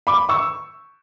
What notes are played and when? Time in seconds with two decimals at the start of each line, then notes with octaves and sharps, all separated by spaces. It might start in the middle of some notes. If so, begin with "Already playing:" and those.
0.07 B5 D6
0.29 C#6 E6